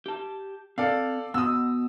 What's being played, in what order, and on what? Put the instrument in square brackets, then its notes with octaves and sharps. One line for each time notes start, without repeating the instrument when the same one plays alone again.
[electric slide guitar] G4 A5
[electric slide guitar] C4 [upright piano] A4 D5 F5
[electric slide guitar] B3 F#4 [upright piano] D#6 E6